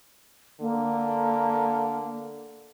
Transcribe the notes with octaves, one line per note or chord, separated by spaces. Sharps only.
D3 A#3